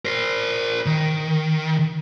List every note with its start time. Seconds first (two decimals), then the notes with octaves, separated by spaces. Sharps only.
0.05 A#4 C5
0.86 D#3